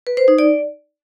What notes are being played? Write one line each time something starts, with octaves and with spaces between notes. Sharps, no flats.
B4
C5
D#4
D5